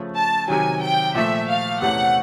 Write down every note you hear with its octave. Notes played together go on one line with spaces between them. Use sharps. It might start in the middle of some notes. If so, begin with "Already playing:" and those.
Already playing: C#3 F3 A3 C#4
A5
C3 D#3 F#3 G#5
G5
A#2 F3 A3 E5
F5
E2 C3 E3 A3 C#4 F#5